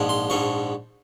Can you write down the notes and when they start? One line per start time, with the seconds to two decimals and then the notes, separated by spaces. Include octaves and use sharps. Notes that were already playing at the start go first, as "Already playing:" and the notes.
Already playing: A#1 G#2 F3
0.09 C6
0.30 A#1 G#2 F3 C#6